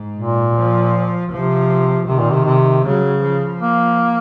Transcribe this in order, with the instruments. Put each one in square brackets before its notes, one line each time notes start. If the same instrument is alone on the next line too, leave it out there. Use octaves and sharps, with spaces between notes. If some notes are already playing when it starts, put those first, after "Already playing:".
Already playing: [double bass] G#2
[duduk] A#2
[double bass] F3
[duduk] C3 [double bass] F3
[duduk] C3 [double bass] D#3
[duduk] A#2
C3
C3
[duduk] C#3 [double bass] F#3
[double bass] F3
[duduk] A#3